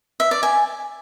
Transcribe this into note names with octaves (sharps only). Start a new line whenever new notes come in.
E5
D5
G#5